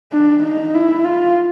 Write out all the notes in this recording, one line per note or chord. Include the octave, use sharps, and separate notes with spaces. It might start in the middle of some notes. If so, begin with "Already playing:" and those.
D4
D#4
E4
F4